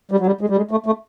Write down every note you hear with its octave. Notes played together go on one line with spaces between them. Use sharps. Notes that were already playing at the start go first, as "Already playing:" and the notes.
G3
F#3
G3
G#3
G3
G#3
A3
A3